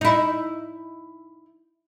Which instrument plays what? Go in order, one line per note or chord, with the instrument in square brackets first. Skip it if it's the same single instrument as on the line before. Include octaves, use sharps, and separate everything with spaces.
[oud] D#4 E4